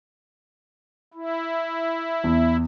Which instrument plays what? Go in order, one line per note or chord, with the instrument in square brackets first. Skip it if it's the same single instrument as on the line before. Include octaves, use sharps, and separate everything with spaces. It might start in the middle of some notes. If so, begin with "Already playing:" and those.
[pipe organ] E4
[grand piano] E2